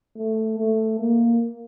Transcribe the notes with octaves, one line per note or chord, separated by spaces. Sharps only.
A3
A3
A#3